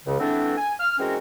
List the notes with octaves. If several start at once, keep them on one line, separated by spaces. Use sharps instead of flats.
C#2 C#3
E3 A3 B3 C4 D4
G#5
F6
E3 G#3 C4 C#4 F#4 A#4